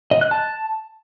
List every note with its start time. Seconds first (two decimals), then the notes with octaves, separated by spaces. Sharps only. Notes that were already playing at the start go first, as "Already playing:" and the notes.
0.11 D#5
0.21 F#6
0.31 A5